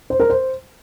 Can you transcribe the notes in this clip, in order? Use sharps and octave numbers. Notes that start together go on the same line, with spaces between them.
C5
A#4
C5